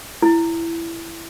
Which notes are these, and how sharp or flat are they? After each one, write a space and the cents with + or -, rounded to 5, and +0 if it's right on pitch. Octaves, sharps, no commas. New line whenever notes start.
E4 +15